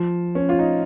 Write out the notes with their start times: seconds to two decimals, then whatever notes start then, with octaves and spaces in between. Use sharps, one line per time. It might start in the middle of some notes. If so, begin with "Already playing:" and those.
Already playing: F3
0.35 C#4
0.49 F4
0.59 D#4